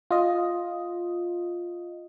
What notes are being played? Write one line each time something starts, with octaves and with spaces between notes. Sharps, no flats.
F4 D#5